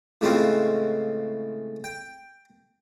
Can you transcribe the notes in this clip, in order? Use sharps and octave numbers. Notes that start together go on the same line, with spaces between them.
A2 C#3 E3 G#3 C4 F4
G5